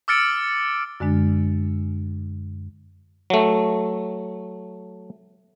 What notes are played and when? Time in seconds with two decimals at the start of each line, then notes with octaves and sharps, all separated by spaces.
0.08 D6 E6 F6 A6 C#7 D7
1.00 F#2 D3 G#3 D4
3.30 F#3 A3